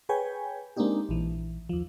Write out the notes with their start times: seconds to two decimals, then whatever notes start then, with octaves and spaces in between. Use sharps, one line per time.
0.09 G#4 B4 C#5 G5 G#5
0.77 G#3 A#3 C4 D4 D#4 G4
1.09 A#1 E3
1.69 D#2 F3